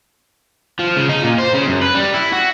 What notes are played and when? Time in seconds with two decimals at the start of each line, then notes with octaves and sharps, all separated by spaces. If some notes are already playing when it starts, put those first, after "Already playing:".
0.79 F3
0.97 C#3
1.09 D#4
1.23 A#2
1.39 C5
1.54 C#3
1.68 F#2
1.82 B4
1.95 G3
2.14 E4
2.33 F#4